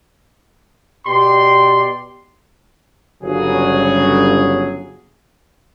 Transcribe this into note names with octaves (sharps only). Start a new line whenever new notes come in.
B2 G4 D5 C6
G1 C#3 F#3 G#4